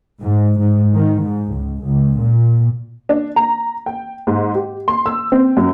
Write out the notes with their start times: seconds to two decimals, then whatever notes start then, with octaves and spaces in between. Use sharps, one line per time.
0.22 G#2
0.59 G#2
0.93 D#3
1.21 G#2
1.52 C#2
1.83 C#2
2.18 A#2
3.09 D4
3.36 A#5
3.86 G5
4.27 G#2
4.55 G4
4.88 C6
5.06 E6
5.32 C4
5.57 F#2